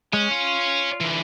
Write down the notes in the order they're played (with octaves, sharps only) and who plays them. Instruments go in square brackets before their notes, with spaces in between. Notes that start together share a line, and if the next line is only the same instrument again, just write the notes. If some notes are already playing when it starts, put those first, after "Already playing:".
[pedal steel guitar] G#3 [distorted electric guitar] C#5 G#5
[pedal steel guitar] F4
[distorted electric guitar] D3 E3